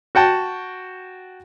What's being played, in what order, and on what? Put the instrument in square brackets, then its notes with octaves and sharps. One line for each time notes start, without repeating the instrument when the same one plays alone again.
[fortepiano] F#4 F#5 G5 A5